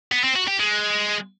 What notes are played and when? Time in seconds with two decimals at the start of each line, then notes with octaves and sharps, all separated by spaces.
0.12 B3
0.24 C4
0.36 F#4
0.47 G4
0.59 G#3